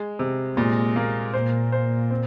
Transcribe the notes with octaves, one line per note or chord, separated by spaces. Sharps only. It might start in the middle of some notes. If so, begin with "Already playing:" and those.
Already playing: G#3
C3
A#2 G#3
A#3
A#2 C5
C5
C4